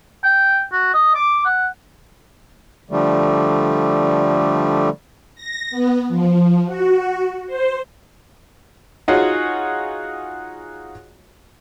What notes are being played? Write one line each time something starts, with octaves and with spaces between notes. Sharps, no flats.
G5
F#4
D#5
D6
F#5
D3 F3 G3 A3
A#6
B3
F3
F#4
C5
D#4 F4 F#4 G#4 C#5